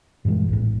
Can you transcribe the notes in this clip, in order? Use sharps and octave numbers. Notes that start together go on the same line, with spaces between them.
G2 A#2 E3 G#3
A#1 E2 A2